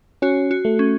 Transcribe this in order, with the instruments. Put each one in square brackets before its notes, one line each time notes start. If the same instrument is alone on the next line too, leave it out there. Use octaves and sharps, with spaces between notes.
[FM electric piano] C#4 [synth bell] F#4
[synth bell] F#4
[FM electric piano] A3
[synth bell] C#4